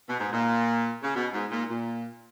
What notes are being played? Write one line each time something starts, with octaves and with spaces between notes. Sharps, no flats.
B2
G#2
A#2
C#3
B2
G#2
A#2
A#2